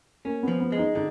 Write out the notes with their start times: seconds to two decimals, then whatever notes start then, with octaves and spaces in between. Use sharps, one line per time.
0.25 A#3 C#4
0.43 F3 B3
0.60 B3
0.72 G#3
0.78 D#4
0.95 D3 D#4